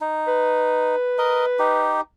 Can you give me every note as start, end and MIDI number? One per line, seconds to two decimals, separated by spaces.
0.01 0.95 63
0.28 1.98 71
1.18 1.45 70
1.18 1.45 75
1.59 2.01 63
1.59 2.01 67